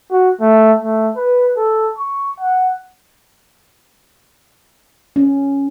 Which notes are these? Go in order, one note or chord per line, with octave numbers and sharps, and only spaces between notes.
F#4
A3
A3
B4
A4
C#6
F#5
C#4